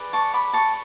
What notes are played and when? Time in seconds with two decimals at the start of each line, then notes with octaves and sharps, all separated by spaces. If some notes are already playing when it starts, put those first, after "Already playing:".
Already playing: G#4 B4 D5
0.13 A5 C#6
0.34 B5 D6
0.53 A5 C#6